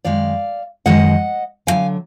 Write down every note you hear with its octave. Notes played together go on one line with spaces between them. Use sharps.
F#2 D#3 G#3 D5 F5
F#2 D#3 G#3 D#5 F#5
D2 D3 F#3 F5 G#5